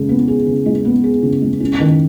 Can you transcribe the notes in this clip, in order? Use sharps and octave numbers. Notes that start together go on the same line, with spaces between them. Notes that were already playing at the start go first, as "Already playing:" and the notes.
Already playing: C#3 G#3
B3
G#4
C#3
G#3
B3
G#4
C#3
G#3
C#4
D#3